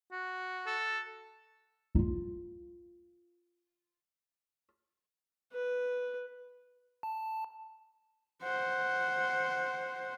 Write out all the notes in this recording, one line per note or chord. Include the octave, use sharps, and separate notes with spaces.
F#4
A4
D#4 F4
B4
A5
C5 F#5